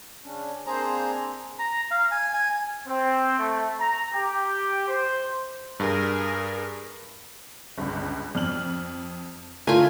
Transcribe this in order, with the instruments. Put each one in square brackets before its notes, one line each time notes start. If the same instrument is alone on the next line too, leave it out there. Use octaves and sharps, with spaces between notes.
[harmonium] C#3 C#4 D4
[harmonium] A#3 C4 D4 [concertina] G#4 A#5 [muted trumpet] C5
[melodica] A#5
F5
G#5
G#5
[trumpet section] C4
A3
A#5
G4
C5
[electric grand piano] G2 [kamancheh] G#4 A#4
[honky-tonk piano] G1 C#2
F2 F6 F#7
[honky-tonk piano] D3 A3 A#4 [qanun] F4 G#5